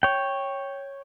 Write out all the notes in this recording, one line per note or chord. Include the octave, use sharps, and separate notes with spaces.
C#5 G5